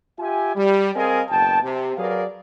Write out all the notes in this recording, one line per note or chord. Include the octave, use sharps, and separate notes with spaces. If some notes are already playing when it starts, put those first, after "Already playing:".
F4 G4 E5 G#5
G3
C4 G#4 A#4 D#5 F5 G#5
F#1 B2 G5 A5
C3
F#3 G#4 A#4 B4 D5 F5